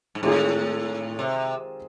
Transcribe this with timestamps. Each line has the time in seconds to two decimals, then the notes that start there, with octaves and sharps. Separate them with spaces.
0.15 G#2
0.23 A2 D#3 G#3 C4 F4 G#4
1.19 C3